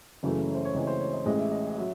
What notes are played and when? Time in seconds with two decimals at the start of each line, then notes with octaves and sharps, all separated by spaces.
0.23 F#1 F#2 C#3 E3 A3
0.55 C5
0.65 C#5
0.74 C#2 C#3 E3 A3 C4 D#5
0.82 C#5
0.87 C5
1.00 C#5
1.13 D#5
1.25 A1 A2 G#3 D#5
1.39 E5
1.52 D#5
1.78 F#3 E5